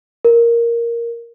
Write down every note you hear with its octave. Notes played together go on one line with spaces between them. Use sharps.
A#4